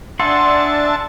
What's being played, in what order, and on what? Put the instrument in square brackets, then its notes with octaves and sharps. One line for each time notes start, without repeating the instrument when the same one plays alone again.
[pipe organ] D4 [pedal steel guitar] G#4 F#5 C6 [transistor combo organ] E5 A5